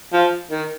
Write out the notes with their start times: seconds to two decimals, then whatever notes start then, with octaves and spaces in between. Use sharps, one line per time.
0.13 F3
0.51 D#3